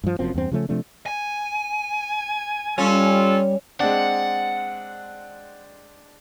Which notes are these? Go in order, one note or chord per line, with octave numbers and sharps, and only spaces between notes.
G2 F3
F#1 F#2 F3 C4
E2 G2 C4
C#3 F3 A3 C#4
C3 F3 A3 D4
G#5
G3 C#4 F4 A4
G#3 C4 D4 F#5